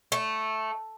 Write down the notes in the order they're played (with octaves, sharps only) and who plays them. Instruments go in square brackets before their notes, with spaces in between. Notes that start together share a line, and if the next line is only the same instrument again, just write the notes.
[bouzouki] A3